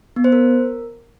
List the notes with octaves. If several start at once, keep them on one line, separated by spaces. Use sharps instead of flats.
B3
C5
A#4